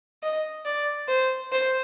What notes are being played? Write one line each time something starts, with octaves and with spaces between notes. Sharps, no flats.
D#5
D5
C5
C5